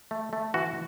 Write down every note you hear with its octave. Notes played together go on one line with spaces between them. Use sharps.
A3
A3
E3 F#4